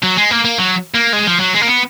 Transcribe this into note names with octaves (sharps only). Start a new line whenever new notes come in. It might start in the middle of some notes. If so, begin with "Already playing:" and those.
F#3
G#3
A#3
A#3
F#3
A#3
G#3
F3
F#3
G#3
A#3
B3